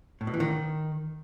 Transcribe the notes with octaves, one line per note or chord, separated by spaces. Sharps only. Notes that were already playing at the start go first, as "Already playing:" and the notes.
A2
B2
E3
D#3